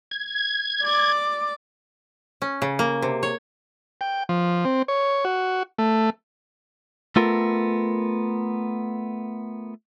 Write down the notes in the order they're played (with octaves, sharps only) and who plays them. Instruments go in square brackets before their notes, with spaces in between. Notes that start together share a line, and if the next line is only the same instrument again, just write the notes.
[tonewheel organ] G#6
[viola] D5 D6
[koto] C#4
C#3
A#3
C3
C#5
[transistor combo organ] G5
F3
C4
C#5
F#4
A3
[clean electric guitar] A3 B3 F4 A4 A#4